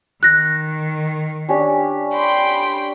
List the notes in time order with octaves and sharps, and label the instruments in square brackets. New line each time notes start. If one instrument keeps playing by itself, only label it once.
[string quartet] D#3 [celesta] F#6 A#6
[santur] C#4 D4 G4
[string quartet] G5 B5 C6